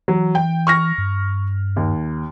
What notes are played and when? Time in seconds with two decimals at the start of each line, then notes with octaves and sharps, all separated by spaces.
0.08 E3 F#3
0.35 G5
0.67 C#6 F6 A#6
0.98 G2
1.76 D#2